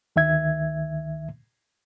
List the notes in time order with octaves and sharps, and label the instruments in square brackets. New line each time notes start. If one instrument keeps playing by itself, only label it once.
[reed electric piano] D2 D#3 E5 G#6